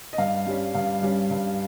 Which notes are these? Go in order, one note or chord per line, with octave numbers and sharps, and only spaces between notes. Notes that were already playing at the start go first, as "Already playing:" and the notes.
D#5
G2 F5
G3 C#4
G2 F5
G3 C#4
G2